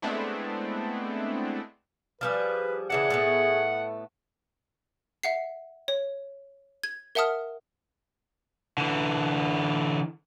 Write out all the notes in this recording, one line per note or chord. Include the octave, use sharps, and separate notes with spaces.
G#3 A3 B3 C4 D4 E4
F3 G3 G#4 B4
C#3 E3 D4 G#4 F#5
A2 A3 B3
E5 F#5 C7
C#5
G#6
A#4 E5 F#5 A5 D#6 F6
D3 E3